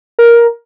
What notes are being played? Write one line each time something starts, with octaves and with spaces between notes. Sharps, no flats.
A#4